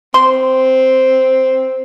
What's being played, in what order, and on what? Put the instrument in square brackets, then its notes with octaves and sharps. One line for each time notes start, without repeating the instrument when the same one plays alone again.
[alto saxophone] C4 [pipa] C6